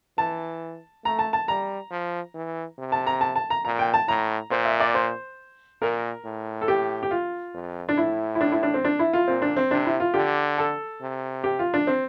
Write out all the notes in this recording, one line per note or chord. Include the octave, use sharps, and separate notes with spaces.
E3 A5
A3 A#5
A5
A5
G3 A#5
F3
E3
C3
A5
A#5
A5
A5
A#5
A#2 A#5
G5
A5
A2 A#5
A#2 C5
E5
D5
C5
A#2 A#4
A2
A4
G4
G4
F4
F2
D4
A2 E4
E4
D4
E4
D4
C4
D4
E4
F4
A#2 C4
D4
C4
C3 D4
E4
F4
D3 G4
A4
C3
G4
F4
D4
C4